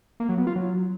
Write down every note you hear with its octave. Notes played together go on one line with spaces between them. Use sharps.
A#3
F#3
B3
F4
F#3